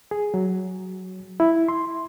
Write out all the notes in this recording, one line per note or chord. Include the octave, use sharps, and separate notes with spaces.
G#4
F#3
E4
C6